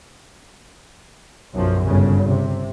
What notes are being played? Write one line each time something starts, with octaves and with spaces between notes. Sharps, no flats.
B1 F#2 F3
G1 C#3
C3